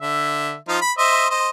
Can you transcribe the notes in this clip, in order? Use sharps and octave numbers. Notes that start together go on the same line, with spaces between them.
D3 E5
F3 D#4 F4
B5
C5 D#5 E5
C5 D#5